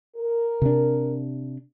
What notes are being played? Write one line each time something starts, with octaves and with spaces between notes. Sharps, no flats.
A#4
C3 D4